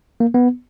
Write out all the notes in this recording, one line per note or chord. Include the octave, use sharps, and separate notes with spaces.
A#3
B3